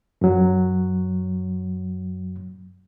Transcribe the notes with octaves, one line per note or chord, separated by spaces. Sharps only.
F#2 F#3